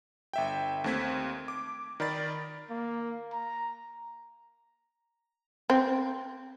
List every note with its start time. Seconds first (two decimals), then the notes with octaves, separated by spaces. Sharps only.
0.33 G1 E5 G5
0.84 D#2 A3 C4 G#6 B6
1.48 D6
2.00 D#3 A#4 D5 B5 A6
2.70 A#3
3.32 A#5
5.70 C4